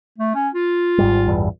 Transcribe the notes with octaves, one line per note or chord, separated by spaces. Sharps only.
A3
C#4
F4
G#1 G#2 G3
A1 E2 G2